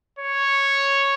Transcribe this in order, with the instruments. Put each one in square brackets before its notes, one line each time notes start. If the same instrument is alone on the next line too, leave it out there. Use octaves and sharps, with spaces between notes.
[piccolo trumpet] C#5